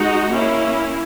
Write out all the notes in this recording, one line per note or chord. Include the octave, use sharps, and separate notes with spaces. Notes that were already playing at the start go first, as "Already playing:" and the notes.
Already playing: G#3 D#4 F#4
A#3 C#4 E4